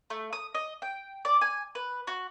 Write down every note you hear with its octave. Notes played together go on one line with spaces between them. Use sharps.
A3
D#6
D#5
G5
D5
G#5
B4
F#4